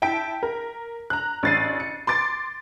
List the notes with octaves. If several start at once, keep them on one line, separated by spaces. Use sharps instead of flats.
E4 G5 A5 B6 D7
A#4
A#5 F#6
A1 D4 A6 C7 D#7
C#7
C6 D6 A6 D7